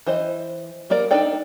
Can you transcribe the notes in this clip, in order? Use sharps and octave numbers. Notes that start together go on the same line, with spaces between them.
E3 C5 D#5
G3 A#3 A#4 D5
D4 D#4 A4 D5 G5